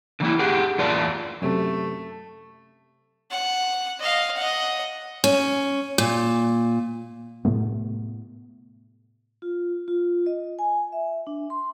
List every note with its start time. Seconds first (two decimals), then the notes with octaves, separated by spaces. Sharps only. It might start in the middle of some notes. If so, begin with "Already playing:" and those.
0.20 D3 E3 A#3 E4
0.39 G4 G#4 F#5
0.78 E2 A#3 F4 D5 A5
1.42 F#2 C3 A3
3.31 F#5
4.00 D#5 F5
4.37 D#5 F#5
5.24 C#4
5.98 A#2
7.45 A2 C3 A3 B3
9.42 F4
9.88 F4
10.26 D#5
10.59 G#5
10.92 E5
11.27 D4
11.50 C6